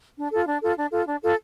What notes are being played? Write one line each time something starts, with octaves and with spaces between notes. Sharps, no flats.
D4
F4 A4
D4
F4 A4
D4
F4 A4
D4
F4 A4